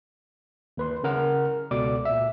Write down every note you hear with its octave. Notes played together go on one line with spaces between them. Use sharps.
D#2 B4 C6
C#3 C#4 A#4 F#5 F6
C#2 B2 A4 D5 D6
A#2 E5